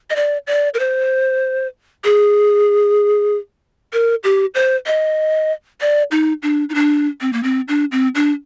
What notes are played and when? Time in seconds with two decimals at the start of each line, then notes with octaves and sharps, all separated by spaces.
0.10 D#5
0.16 D5
0.47 D5
0.74 A#4
0.79 C5
2.04 G#4
3.93 A#4
4.24 G4
4.54 C5
4.86 D#5
5.81 D5
6.11 D#4
6.43 D4
6.70 D#4
6.75 D4
7.21 C4
7.33 A#3
7.43 C4
7.68 D4
7.92 C4
8.15 D4